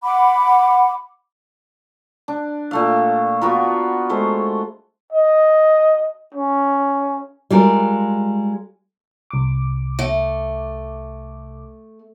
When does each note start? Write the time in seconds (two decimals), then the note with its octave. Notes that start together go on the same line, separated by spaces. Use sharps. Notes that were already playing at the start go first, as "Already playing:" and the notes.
0.03 F#5 B5 D6
2.28 D4
2.71 A#2 A3 F5
3.41 B3 F4 F#4 A#4
4.09 G#3 A3 C5
5.13 D#5
6.34 C#4
7.50 G3 G#3 F4 A#4
9.31 C2 D6
9.99 A3